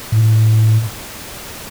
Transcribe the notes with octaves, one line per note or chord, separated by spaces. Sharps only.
A2